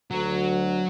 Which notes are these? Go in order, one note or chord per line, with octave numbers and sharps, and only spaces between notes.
D2 F#3